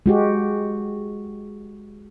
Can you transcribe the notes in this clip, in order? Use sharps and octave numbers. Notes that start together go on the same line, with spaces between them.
G#3 F#4 G4